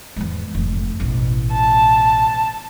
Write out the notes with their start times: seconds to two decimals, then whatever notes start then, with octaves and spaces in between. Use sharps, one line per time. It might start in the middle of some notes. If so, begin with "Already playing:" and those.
0.16 E2 G#2
0.55 F1
1.00 A1 B2
1.52 A5